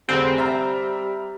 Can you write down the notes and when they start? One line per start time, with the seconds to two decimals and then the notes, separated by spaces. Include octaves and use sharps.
0.09 F1 D3 G3 C4 G#4
0.38 E5 A#5 F6